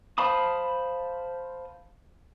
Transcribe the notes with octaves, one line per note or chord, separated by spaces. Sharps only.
C5 F5 A5 B5 D#6